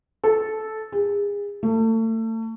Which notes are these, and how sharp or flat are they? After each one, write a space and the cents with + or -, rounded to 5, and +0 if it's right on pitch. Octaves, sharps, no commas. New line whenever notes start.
A4 -10
G#4 -35
A3 +35